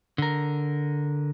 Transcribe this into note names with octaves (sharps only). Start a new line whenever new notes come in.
D3 A#4